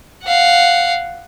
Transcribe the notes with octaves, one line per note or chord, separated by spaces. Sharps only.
F5 F#5